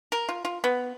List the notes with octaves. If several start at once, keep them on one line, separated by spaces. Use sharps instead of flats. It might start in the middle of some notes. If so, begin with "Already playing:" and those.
A#4
F4
F4
B3